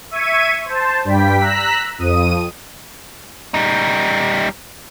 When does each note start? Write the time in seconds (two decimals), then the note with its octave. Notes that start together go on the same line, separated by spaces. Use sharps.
0.11 E5 C#6 G#6 D#7
0.65 C5 A5
1.04 G2 G3 G5 B6
1.40 A#5 E6 F#6 B6
1.99 F2 D#6 D#7
3.54 G3 D#4